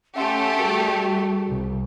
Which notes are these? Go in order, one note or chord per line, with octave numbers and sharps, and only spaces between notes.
A3 C#4 G4 A4 E5 F#5 C6
G3 F#4 G#4 A#4
C2